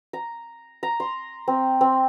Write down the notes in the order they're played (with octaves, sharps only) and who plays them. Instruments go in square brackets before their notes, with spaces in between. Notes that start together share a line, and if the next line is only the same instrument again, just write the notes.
[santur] A#5
A#5
C6
C4
C4